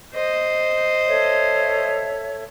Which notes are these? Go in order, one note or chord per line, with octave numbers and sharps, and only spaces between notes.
C5 D#5
A4 C#5 E5